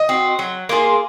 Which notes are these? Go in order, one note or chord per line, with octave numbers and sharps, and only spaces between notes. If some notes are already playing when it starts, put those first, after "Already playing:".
Already playing: D#5
C4 F#4
F#3
A#3 F4 G#4